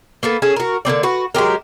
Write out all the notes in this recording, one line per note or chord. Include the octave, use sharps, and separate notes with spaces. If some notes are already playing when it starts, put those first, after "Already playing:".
A#3 B3 A4
C#4 G#4 A4
F#4 A#4
D3 A#3 C4 D5
F#4 B4
F#3 G#3 G4 A#4